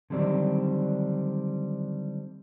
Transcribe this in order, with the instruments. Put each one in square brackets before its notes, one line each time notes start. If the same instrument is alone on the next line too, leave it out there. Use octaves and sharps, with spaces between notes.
[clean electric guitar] D3 D#3 F#3 G3 C4 D4